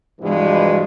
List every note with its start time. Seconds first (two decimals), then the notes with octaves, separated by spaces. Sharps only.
0.21 G2 B2 E3 F3 G3 G#3